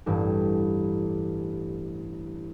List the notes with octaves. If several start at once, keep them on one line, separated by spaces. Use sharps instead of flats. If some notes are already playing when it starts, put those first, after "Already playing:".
A1 G2 G4